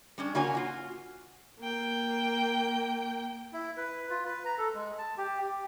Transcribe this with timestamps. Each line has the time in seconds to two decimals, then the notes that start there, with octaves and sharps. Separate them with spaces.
0.18 G3 C#4 D4
0.35 C#3 A#3 F4 F#4 C#5 G#5
0.55 F4 F#4
1.59 A#3 G5
3.53 E4
3.77 B4
4.10 F4
4.25 B4
4.45 A#5
4.58 A4
4.75 G#3
4.98 A5
5.18 G4
5.42 G4